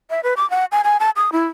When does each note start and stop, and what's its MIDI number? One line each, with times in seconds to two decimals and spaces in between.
0.10 0.21 76
0.23 0.34 71
0.37 0.49 86
0.50 0.65 78
0.72 0.81 80
0.84 0.97 80
1.00 1.10 81
1.16 1.30 87
1.32 1.45 64